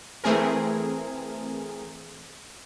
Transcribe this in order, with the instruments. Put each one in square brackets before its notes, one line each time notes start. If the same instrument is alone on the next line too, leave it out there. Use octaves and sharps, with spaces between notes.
[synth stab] E3 A3 C4 G#4 A#4